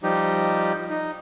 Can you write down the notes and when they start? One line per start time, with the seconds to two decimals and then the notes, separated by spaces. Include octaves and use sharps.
0.03 F3 G3 D#4 G4
0.90 D#4